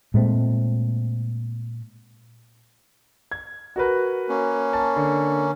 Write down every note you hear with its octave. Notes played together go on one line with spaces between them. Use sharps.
A#2 G#3 A3 C4
G#6
F#4 A#4 B4
A#3 C#4
A5
D3